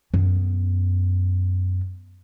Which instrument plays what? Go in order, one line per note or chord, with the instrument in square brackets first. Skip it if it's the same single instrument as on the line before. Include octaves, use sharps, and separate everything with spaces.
[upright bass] F#2 B3